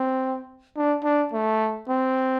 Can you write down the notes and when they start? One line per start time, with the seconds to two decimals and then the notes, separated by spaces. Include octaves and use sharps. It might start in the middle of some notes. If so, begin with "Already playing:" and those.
Already playing: C4
0.77 D4
1.04 D4
1.33 A3
1.89 C4